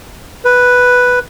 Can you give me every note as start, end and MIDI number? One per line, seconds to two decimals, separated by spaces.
0.45 1.19 71